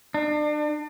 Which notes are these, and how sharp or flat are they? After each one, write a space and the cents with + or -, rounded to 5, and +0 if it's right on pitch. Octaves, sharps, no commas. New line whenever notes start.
D4 +35